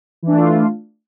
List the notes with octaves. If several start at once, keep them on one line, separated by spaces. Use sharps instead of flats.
E3 A3 D4 F4